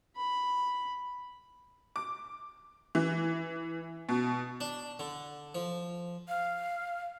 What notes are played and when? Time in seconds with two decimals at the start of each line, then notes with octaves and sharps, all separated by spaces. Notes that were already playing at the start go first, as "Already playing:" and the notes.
0.16 B5
1.96 D6
2.95 E3
4.09 B2
4.61 D4
4.99 D3
5.55 F3
6.28 F5